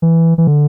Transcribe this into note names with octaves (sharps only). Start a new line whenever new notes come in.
E3
E3
D3